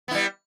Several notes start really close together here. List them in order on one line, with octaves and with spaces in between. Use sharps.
B3 E4 G3